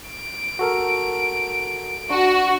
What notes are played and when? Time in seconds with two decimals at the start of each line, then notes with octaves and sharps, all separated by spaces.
0.10 D7
0.59 F#4 A4 A#4
2.10 D4 F#4